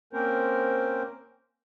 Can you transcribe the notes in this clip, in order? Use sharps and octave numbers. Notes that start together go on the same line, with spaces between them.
A#3 C4 C#4 A#4 C5